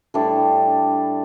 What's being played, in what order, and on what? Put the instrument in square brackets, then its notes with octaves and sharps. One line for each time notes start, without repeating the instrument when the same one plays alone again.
[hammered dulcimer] A2 G3 D4 A4